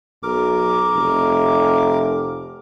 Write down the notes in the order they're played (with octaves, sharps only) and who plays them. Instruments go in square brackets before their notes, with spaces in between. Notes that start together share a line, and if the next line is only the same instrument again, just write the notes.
[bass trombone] B1 [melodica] A#4 D6
[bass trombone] F1